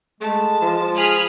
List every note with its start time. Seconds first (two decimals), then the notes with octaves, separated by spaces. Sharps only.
0.21 G#3 A3 A5
0.62 F3
0.97 G#4 B5 F6 D#7